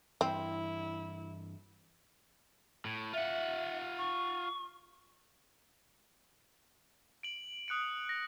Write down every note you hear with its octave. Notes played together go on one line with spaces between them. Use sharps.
G2 E3 C4 E4
A2
F4 E5 F#5
C#6
D7 F#7
D#6 F#6 C#7 D7
A#6